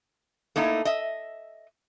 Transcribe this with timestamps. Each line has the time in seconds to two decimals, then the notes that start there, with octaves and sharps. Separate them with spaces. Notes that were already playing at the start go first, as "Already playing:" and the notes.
0.56 A3 A#3 D#4 E4
0.85 D#5 E5